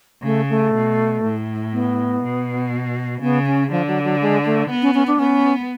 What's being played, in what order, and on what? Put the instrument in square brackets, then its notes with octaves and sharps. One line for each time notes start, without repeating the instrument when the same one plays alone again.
[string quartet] C#3 [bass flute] A3
[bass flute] A3
[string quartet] B2
A2
[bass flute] B3
[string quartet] B2
[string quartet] C#3 [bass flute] B3
[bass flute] C#4
[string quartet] D3 [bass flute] F3
[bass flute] F#3
F#3
G#3
A3
[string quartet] B3
[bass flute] C#4
C#4
D4
[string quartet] B3 [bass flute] C#4